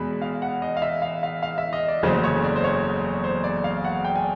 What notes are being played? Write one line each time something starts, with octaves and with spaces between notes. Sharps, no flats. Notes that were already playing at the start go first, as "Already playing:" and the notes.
Already playing: E2 B2 G#3 B5
F5
F#5
D#5
F5
E5
F5
F5
F5
E5
D#5
D5
F#1 E2 C#3 F#3 A3 C5
C#5
D5
C5
C#5
C5
D5
F5
F#5
G5
G#5